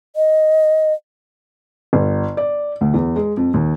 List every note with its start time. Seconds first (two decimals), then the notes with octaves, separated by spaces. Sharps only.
0.16 D#5
1.93 G1
2.37 D5
2.81 D2
2.94 E2
3.16 G#3
3.37 F2
3.54 D#2